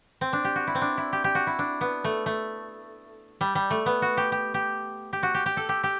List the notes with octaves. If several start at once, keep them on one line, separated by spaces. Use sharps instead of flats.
C4
D4
G4
F#4
E4
C4
D4
E4
G4
G4
F#4
E4
D4
B3
A3
A3
G3
G3
A3
B3
F#4
G4
G4
G4
G4
F#4
G4
G4
A4
G4
G4